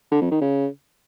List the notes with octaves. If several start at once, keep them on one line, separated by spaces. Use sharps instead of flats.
D3
F2
D#3
C#3